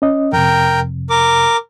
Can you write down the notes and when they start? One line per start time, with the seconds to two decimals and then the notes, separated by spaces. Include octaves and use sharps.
0.02 C#4 D#5
0.33 F2 C3 A#4 G5
1.10 A#4 D6